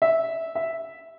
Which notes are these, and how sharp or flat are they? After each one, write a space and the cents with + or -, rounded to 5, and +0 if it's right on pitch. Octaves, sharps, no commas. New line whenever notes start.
E5 -10
E5 -5